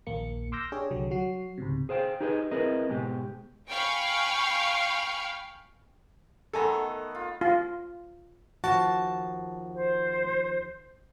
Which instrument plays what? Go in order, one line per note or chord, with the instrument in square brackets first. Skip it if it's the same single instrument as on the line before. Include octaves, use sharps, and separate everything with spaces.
[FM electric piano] A#1 D#2 A#3 C#7
C6 D6 E6 F6 G6 A#6
D4 G4 G#4 C#5
C2 D3 F#3
F#3 F#4 C7
C#2 G#2 C3
[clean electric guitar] G#4 C5 F5 G5
D#4 G4 G#4 B4 D#5
C4 E4 G#4 A#4 B4 D#5
G#2 B2 G#3 G4
[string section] F5 G5 G#5 B5 C#6
[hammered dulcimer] D#3 A3 B3 [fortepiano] A4 G#5 A#5
[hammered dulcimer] F4
[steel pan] F4
[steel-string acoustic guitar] D#2 F3 A5 [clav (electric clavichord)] F#4
[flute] C5